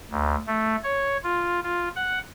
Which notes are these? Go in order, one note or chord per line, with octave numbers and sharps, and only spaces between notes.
D2
A3
C#5
F4
F4
F#5